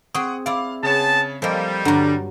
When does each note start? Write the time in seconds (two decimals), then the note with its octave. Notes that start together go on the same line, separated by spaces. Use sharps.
0.15 C4 G#4 F#5 C#6 D#6
0.46 E4 D5 F5
0.83 C#3 B3 G#4 C#5 A5
1.42 F3 G3 A#3 A4 C5 D#5
1.85 G2 D3 F#3 F#5 A#5